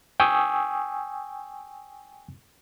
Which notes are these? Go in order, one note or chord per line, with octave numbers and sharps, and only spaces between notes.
G5 G#5 C#6 D#6 E6